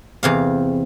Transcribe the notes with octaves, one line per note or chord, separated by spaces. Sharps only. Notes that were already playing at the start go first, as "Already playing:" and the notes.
E2 C3 F5